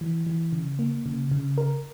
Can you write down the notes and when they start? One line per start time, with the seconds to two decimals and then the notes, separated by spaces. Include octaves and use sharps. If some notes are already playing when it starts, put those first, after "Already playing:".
0.01 E3
0.27 E3
0.53 C#3
0.79 A#3
1.06 C#3
1.31 C#3
1.58 A#4